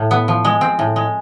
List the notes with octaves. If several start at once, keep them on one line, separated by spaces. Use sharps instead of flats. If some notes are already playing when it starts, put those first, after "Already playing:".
Already playing: A2
B3
F3
G#3
C4
A2
G#3